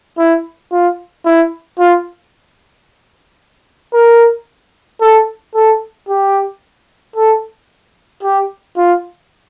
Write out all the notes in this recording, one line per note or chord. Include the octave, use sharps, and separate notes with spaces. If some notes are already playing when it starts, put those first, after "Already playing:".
E4
F4
E4
F4
A#4
A4
A4
G4
A4
G4
F4